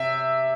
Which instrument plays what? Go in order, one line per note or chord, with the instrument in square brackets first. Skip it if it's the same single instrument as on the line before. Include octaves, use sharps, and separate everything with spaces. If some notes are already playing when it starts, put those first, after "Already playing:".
Already playing: [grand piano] C3 E5